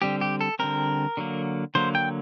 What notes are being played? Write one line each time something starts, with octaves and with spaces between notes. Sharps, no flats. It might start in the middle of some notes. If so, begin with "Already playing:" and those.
D3 G3 C4 G4
G4
A4
D3 G3 C4 A#4
D3 F#3 A#3
D3 F#3 A#3 C5
G5